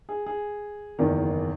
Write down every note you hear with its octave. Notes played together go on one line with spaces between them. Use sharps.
G#4
G#4
F#1 E2 D#3